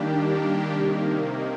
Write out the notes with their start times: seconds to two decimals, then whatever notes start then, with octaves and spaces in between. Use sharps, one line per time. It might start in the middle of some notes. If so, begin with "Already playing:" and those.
Already playing: D#3 G3 A#3 D4 G4
0.73 C3 D#3 A#3